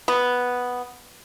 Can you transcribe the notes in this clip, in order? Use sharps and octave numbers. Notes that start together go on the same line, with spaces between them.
B3